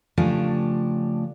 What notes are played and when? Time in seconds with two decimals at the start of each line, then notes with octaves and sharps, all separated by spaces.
0.17 C#3 F3 A3 D4 G4 G#5